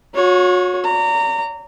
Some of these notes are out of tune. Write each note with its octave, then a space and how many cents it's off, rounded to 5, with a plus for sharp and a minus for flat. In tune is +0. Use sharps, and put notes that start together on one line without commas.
F#4 -40 C#5 +0
D5 -35 A#5 -25